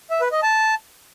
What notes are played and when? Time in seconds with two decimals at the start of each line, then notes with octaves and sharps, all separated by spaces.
0.10 E5
0.21 B4
0.32 D#5
0.43 A5